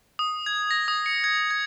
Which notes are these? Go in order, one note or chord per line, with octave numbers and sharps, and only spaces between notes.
D#6
G#6
A#6
D#6
C#7
G#6
G#6